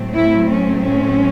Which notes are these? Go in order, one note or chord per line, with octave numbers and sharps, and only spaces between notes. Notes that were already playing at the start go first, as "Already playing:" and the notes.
Already playing: A2 F#3 A3 C4
E4
C#4
C#4